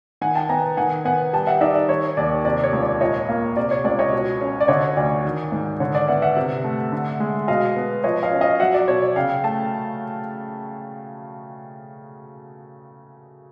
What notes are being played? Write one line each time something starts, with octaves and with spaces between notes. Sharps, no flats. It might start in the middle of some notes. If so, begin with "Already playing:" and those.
D#3 F#5 G#5
G5 A5
B3 G#5 A#5
D#3 F#5 G#5
B3 F#5 G#5
G3 G5 A5
E5 F#5
D#4 D5 E5
D5
D#3 C#5
D#2 D5
C3 D5
C#5
C#2
D5
A#2 C#5 D#5
A#3
C3 D5
C#5
C#2 D5
C#5 D#5
B2
C#4
D5
D3 C#5 D#5
D2 D5
D#3
G#2
D3 C#5
D5
B3 E5 F#5
E5 F#5
C3
A3
D3
G#3
B2 D#5 F5
B3
F3 C#5 D#5
D#5 F5
C#4
D#5 F5
F#3 E5 F#5
D5
B2 C#5
D5
C#3 F5 G5
A3 G5 A5